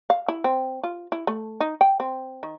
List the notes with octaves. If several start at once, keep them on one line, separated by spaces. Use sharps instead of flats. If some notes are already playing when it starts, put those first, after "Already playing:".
F5
E4
C4
F4
E4
A3
D#4
G5
C4
D#3